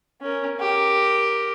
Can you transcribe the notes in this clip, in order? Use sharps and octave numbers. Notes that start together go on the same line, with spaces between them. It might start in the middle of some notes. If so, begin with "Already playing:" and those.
C#4 A#4
G4 A#4